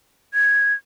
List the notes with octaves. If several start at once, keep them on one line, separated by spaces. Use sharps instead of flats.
G#6